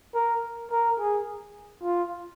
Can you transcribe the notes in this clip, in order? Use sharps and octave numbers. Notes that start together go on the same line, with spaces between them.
A#4
A#4
G#4
F4